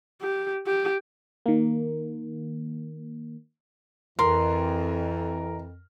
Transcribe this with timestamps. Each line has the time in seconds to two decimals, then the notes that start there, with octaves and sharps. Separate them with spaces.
0.22 G4
0.66 G4
1.46 D#3 A#3
4.19 F2 E3 A#4 C6